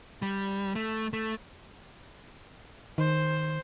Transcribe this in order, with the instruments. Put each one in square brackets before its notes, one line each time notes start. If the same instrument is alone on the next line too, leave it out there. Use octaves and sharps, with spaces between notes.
[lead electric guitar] G3
A3
A3
[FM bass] D#3 [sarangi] C5